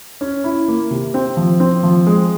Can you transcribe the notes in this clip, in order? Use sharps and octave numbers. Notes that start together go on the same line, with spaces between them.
C#4
E4
A#3
C3
C4
F3
C4
F3
G#3